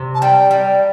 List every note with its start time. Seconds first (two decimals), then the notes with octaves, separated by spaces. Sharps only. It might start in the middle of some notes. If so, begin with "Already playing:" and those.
Already playing: C3
0.15 A5
0.22 G3 G5
0.51 G3